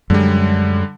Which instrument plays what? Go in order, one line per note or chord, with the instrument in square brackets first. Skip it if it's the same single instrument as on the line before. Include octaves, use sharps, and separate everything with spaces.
[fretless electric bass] F#2 G#3 [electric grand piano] D3 G3